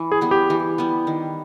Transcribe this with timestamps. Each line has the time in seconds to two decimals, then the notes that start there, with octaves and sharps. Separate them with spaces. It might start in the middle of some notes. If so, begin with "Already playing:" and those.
Already playing: E3
0.12 G#4
0.21 G3 B3
0.31 G4
0.50 E3
0.78 G3 B3
1.07 D#3